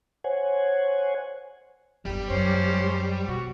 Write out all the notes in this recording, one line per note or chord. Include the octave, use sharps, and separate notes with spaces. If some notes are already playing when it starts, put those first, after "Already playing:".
C5 C#5 F#5 G#5
G1 G2 G3 G4
F#2 C#4 C5
B2 F#4